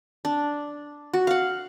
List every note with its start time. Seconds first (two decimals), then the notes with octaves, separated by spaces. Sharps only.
0.25 D4
1.14 F#4
1.27 F5 F#5